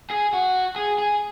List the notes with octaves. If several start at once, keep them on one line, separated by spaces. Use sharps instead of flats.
G#4
F#4
G#4
G#4